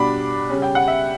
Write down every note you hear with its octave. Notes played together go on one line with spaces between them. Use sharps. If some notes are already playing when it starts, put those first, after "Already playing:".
Already playing: B2 G3 D4 B5 D6
C#3 G3 C#4
G5
F#5
E5